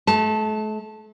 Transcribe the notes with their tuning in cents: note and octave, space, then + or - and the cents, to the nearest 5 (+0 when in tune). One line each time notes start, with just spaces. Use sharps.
A3 -40 A5 +0